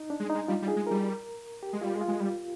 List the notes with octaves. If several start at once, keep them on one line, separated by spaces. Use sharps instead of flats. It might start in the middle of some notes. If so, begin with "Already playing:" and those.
Already playing: D#4
D4
G#3
D#4
G#3
G3 F4
G3
G#4
G#3
G3 A#4
G4
G#3
G3 F4
G#3
F4
G#3
G3